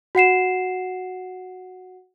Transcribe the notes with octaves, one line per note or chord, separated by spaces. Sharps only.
F#4 F#5 C7 E7